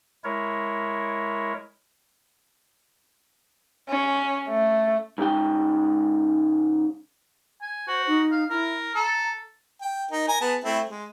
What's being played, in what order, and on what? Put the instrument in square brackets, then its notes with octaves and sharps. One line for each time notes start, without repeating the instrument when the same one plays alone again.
[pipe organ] G#3 E4 A#4 C#5
[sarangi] C#4
A3
[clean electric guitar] G#2 C#3 G#3 G5
[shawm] G#5
[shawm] F#4 [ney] C5
[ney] D#4
[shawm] F5
[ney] E4 [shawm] A#4
[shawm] A4 [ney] A#5
[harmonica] G5
D#4 A#4
A#4 G#5 A#5
B3 G#4 A5
A3 C4 E4
G#3